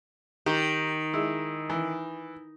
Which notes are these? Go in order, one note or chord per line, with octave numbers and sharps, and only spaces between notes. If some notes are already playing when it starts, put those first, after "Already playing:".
D#3 G4
G#3 E4
E3